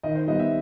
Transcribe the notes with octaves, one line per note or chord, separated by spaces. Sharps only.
D#3 D#5
C5
G3 B3 D#5
E5